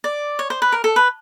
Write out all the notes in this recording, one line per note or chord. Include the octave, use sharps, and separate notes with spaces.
D5
C#5
C5
B4
A#4
A4
B4